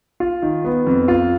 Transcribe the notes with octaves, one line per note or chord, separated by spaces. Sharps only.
F4
D#3
B3
F2
F4